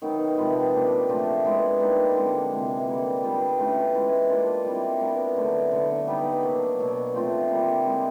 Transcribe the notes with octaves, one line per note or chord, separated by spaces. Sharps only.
D#3 F#3 B3 D#4
C3 F3 G#3 B3
F#3 A#3 D4 G4
A#2 F3 A3 D4
G#3 B3 E4
G3 A#3 D#4
D3 F3 G#3 C4
C3 E3 G#3
D3 G3 A#3
G3 B3 D4 F4
E3 A3 C#4 F4
E3 G#3 C#4 E4
A#3 D4 F4 A4
G3 C4 E4
B3 D4 F#4 A#4
D3 F#3 A3
D3 F#3 B3
G3 B3 D#4 G4
F#3 A#3 D4
B2 F#3 A#3
F3 A3 C4 F4
D3 G3 A#3
G#3 C4 E4 G#4